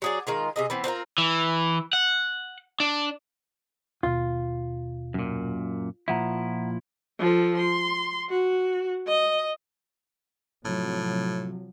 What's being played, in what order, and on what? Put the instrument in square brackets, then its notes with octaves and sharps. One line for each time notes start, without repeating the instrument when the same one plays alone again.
[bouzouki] F#3 G#4 D5
D#3 G#3 F4
C3 G#4 D#5
E3 B3 C4
C4 D4 F4 A#4
[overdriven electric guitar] E3
F#5
D4
[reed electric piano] D#2 B2 [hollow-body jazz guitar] F4
[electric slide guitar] F#2 A#2
[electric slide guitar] A#2 F3 E4 [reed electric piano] E5 F#5 A#5
[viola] F3 A4
C6
F#4
D#5
[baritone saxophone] A2 [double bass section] C3 F3 F#3